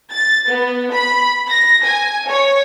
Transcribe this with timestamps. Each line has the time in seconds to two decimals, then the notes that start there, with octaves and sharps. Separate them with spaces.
0.11 A6
0.47 B3
0.92 B5
1.50 A#6
1.84 G#5
2.28 C#5